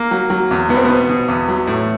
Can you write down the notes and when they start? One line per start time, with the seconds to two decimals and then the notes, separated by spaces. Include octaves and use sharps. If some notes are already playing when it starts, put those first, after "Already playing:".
Already playing: A#3
0.11 F#3
0.30 F#3
0.51 E2
0.69 B2 B3
0.77 C4
0.85 B2 B3
1.09 B2
1.28 E2
1.48 F#3
1.67 A2